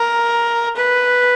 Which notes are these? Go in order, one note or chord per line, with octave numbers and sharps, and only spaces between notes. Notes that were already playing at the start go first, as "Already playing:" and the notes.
Already playing: A#4
B4